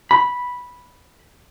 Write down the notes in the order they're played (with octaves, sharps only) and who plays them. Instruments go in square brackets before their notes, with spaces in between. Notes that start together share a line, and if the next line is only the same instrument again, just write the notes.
[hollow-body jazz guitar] B5